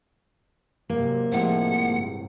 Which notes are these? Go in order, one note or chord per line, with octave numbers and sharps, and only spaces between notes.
G#2 C3 F#3 A#3
A2 C3 F3 G#3 F#5
G1